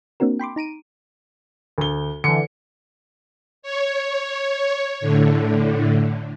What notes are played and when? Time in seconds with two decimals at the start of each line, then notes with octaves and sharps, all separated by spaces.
0.20 A#3 C4 D4 F#4 A#4
0.39 G5 B5 C6 D6
0.56 D#4 A#5 D7 D#7
1.78 D2 G7
2.24 D3 E3 C#7
3.63 C#5
5.01 A2 D3